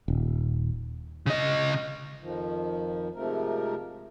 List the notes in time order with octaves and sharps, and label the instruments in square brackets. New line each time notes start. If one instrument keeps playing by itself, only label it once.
[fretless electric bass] D#1
[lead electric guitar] C#3 D#5
[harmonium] F2 D#3 F3
G#2 C3 F3 A3 A#4